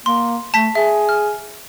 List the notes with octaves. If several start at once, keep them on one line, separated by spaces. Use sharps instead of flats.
A#3 C6
A3 A5 B6
G#4 E5
F6